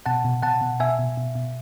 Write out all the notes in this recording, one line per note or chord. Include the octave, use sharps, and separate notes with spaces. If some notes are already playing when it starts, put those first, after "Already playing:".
B2 F#5 A5
B2
B2 F#5 A5
B2
B2 E5 G#5
B2
B2
B2